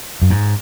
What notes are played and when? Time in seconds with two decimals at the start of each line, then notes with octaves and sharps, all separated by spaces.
0.22 F#2
0.31 G#2